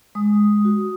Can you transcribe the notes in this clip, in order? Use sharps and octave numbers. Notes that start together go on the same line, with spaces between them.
G#3 D#6
G#3
F#4